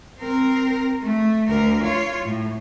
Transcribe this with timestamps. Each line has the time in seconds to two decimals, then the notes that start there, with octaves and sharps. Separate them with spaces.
0.18 C4 A#4
1.02 A3
1.48 D2 A#4
1.82 F4 C#5
2.26 A2